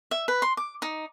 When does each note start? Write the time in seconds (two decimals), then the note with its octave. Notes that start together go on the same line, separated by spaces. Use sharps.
0.11 E5
0.28 B4
0.42 C6
0.57 D6
0.82 D#4